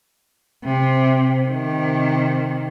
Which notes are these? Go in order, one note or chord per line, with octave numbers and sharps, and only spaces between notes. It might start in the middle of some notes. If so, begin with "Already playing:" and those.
C3
C3 D#3